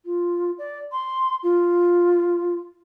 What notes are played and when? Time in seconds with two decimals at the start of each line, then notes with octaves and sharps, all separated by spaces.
0.05 F4
0.58 D5
0.92 C6
1.43 F4